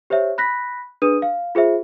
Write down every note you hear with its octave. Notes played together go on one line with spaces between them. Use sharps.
G4 C5 C#5 E5
B5 F#6 A#6 B6
D4 G#4 B4 D#6 D#7
F5
F4 G#4 C5 E5